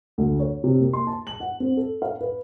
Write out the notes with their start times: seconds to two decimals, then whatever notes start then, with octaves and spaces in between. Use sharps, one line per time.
0.18 D2
0.40 C#5
0.64 C3
0.80 A#3
0.93 C6
1.07 A5
1.27 F#7
1.40 F#5
1.60 C4
1.77 A4
2.02 F5
2.21 B4